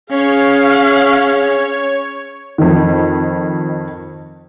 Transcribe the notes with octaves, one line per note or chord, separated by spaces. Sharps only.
C#4 G#4 C#5 F5
F2 D#3